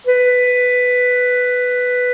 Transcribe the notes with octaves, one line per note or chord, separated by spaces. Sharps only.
B4